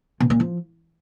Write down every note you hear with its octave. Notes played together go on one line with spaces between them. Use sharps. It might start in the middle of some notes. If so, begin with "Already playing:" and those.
B2
A#2
F3